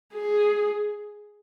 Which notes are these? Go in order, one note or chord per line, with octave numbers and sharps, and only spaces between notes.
G#4